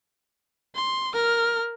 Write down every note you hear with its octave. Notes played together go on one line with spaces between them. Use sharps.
C6
A#4 F6